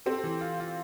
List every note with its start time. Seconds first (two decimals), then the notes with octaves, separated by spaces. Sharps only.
0.06 C4 G4 A4
0.24 E3
0.41 F4
0.60 F4